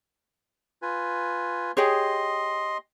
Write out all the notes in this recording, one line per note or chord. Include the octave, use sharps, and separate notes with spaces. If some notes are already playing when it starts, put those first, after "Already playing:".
F4 B4 G#5
G4 G#4 C#5 D#5 C6